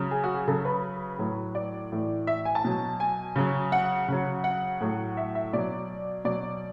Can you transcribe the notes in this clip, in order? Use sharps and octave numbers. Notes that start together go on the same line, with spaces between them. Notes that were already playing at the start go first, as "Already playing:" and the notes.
Already playing: C#3 F#3
G#4
F#4
G#4
C#3 F#3 A4
B4
A2 F#3
D5
A2 E3
E5
G#5
A5
B2 F#3
G#5
C#3 F#3
F#5
C#3 F#3
F#5
A2 F#3
E5
E5
B2 F#3 D5
B2 F#3 D5